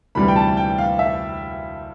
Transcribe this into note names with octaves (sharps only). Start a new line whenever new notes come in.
D2 C3 E3 G3 B5
G5
A5
G5
F5
E5